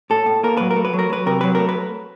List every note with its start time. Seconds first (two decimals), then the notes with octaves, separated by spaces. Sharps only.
0.10 A2 A4
0.26 A2
0.43 A#3 A#4
0.57 F#3 B4
0.71 A#4
0.76 A3
0.85 B4
0.93 F#3
0.99 A#4
1.10 F#3 B4
1.26 C3 A#4
1.41 F#3 B4
1.55 A3 A#4
1.69 B4